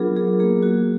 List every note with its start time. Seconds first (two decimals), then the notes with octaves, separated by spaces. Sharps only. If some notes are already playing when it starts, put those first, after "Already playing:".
Already playing: F#3 B3 D4 F4 G#4 A#4
0.17 F#3 G#4
0.40 A#3 G#4
0.63 F#4